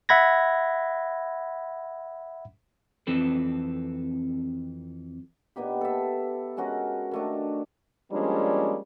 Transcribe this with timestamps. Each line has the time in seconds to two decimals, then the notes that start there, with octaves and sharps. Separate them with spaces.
0.09 E5 F#5 B5 G#6 A#6
3.07 F2 E3 C4 A4 B4
5.56 A#2 B3 D#4 G4
5.81 A4 E5
6.57 G#3 C#4 F#4 A#4
7.11 D#3 A3 D4
8.11 F3 G3 G#3 A#3 C#4 D4